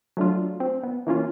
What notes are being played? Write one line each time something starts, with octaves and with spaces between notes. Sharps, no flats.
F#3 A3 D4 F4
C4
B3
E3 A#3 C#4 F4